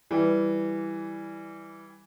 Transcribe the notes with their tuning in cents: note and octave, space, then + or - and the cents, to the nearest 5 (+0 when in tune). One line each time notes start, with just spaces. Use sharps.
E3 +0 G3 +0